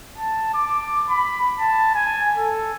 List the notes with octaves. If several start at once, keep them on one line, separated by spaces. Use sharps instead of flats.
A5
D6
B5
A5
G#5
A4